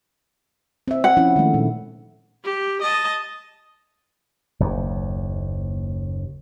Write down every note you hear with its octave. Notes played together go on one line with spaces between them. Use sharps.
C4 E5
F#5
F3 C#4 E4
D#3 G#3 A3
A#2
G4
D#5 A5
F#1 D#2